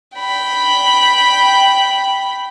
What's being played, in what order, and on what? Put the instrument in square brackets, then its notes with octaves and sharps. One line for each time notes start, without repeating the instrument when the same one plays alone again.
[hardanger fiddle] G5 B5